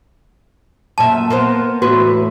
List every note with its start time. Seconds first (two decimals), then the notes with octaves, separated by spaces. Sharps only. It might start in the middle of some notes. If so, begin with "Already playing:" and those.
0.98 F#2 A#2 E5 A5
1.30 A#3 B3 C5
1.82 E2 A2 F#4 B4